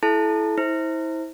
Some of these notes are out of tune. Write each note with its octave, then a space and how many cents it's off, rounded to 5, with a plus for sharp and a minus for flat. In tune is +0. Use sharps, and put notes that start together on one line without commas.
E4 +0 A4 -35 A5 +0
E4 -30 C5 +15